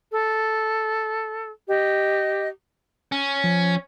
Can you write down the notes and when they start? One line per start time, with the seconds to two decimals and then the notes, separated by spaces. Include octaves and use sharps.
0.10 A4
1.67 G4 D#5
3.12 C#4
3.44 F3